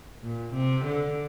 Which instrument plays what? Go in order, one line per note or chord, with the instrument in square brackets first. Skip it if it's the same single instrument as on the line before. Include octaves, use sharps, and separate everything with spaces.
[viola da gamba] A#2
C3
D3